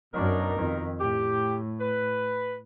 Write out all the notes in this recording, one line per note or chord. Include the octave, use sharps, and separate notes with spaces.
F#2 B2 D4 D#4 A#4
F2 D#3
A2 G4
B4